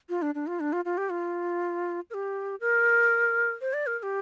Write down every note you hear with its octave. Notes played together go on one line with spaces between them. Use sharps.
F4
D4
D4
F4
D4
F4
F4
G4
F4
A#4
G4
A#4
C5
D5
A#4
A#4
G4